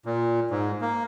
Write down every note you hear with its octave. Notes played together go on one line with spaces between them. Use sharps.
A#2
G#2
A#3